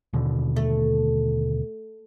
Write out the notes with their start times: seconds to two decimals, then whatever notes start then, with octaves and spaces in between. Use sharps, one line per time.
0.13 D#2 B2 D3
0.56 A3